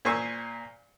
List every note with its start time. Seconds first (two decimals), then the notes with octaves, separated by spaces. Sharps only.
0.05 A#2 C5 G#5 C#6 E6